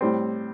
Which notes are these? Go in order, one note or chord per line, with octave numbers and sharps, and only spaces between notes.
A2 G3 C4